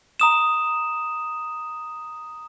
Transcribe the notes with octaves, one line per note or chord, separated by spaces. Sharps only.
A#5 D#6 E7